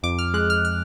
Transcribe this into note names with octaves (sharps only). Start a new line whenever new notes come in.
F2 D6
F6
G#3 F#6
F6
F6